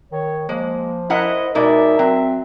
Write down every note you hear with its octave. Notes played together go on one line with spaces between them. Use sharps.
D#3 C#5
F3 G#3 A#3 C5
E4 A#4 D#5 F#5
B2 G#3 D#4 A#4 D5 E5
F#3 C4